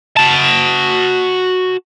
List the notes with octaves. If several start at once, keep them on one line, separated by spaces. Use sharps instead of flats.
F#4 A5